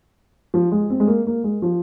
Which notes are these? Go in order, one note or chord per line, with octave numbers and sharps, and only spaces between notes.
F3
G#3
C4
G#3
A#3
A#3
G#3
F3